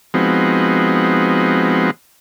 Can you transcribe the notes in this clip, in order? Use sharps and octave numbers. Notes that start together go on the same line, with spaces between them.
F3 G#3 B3 C4 D#4 F#4